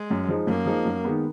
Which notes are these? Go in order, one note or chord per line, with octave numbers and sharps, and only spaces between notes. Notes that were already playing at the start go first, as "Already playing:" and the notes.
Already playing: G#3
F#2
F3 G#3 D#4
F#2 A#3
F3 G#3 D#4
F#2
D#3 G#3 B3